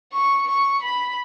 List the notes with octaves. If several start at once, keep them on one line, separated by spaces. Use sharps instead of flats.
C#6
C#6
B5